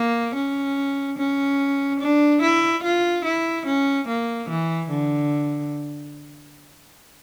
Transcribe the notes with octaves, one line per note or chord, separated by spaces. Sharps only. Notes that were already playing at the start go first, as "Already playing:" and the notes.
Already playing: A#3
C#4
C#4
D4
E4
F4
E4
C#4
A#3
E3
D3